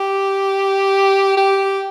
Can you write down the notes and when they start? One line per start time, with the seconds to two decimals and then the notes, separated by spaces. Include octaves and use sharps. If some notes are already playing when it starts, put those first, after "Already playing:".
Already playing: G4
1.37 G4